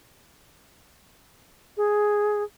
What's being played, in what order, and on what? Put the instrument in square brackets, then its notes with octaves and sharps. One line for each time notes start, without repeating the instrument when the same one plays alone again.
[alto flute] G#4